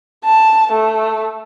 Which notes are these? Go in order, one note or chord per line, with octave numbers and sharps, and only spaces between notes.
A5
A3